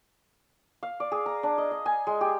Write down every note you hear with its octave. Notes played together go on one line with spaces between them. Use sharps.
F5
D5
G#4
A#5
D4
D#5
D#5
G#5
G#3
G4